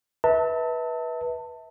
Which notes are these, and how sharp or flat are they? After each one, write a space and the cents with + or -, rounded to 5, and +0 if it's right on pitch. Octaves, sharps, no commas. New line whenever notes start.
B4 -15 E5 -35 A5 +25